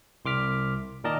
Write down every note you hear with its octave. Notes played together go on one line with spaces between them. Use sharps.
C2 C6 D6 F6 B6
A#2 D#3 A#4 D5 D#5 A5